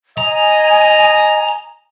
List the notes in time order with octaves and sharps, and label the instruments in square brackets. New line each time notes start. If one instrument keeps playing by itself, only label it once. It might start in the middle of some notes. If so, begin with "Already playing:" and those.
[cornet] D#5 [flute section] G#5 [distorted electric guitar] A#5